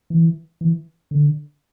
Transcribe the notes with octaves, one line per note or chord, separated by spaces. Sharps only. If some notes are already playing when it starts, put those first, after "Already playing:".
E3
E3
D3